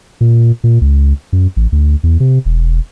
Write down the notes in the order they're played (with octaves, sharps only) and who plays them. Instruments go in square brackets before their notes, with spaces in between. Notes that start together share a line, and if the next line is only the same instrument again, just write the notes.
[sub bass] A#2
A#2
C#2
F#2
A1
D2
E2
C3
E1